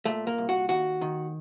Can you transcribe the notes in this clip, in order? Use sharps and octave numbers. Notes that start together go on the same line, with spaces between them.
A#2 A3
A#3
C2
F#4
D#2 F#4
D#3